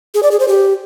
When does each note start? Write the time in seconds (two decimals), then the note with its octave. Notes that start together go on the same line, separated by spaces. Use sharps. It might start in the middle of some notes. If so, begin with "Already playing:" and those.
0.14 G#4
0.23 D5
0.31 G#4
0.40 C5
0.48 G4